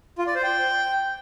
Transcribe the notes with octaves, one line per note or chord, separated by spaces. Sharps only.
F4
D5
C5
G5